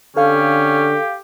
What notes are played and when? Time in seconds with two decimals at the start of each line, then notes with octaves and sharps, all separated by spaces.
0.16 D3 C#4 G4 A4 F5